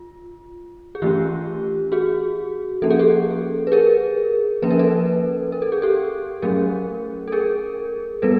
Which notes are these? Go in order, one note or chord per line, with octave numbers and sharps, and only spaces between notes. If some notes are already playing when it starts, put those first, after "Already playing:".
Already playing: F4
G#4
E3 A3 C#4 F4 G4
F#4 G#4
F3 A#3 C#4 A4
G#4
G4 A4
B4
G#4 A#4
F3 A#3 C#4 B4
A#4
A4 B4
A#4
A4
G#4
G4 A4
F#3 A3 C#4 G#4 A#4
A4
G#4 A#4
G3 B3 A4 B4